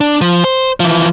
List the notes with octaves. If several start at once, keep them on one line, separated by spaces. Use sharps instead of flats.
D4
F3
C5
E3 F3